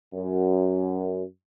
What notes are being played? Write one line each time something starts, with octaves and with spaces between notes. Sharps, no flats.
F#2